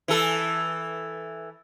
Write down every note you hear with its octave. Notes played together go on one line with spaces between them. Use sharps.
E3 A4